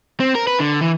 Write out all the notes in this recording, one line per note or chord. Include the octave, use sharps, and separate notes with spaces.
C4
A#4
B4
D3
E3